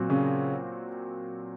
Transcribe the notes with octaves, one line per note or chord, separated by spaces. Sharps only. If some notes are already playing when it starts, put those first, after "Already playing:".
Already playing: A#2 F#3 C4 F#4
C#3 C#4